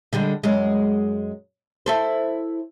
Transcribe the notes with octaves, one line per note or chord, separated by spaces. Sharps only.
D3 G3 G#3
F#2 G#3
E4 A4 C5